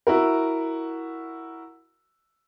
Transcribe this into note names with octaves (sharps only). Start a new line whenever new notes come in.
E4 F#4 A#4